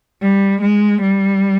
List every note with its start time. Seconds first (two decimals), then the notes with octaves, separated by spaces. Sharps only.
0.22 G3
0.62 G#3
1.02 G3